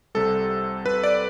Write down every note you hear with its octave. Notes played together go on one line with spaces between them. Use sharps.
C2 C3 G3 A4
B4
D5